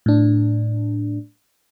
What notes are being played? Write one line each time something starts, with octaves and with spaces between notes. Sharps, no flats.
A2 D4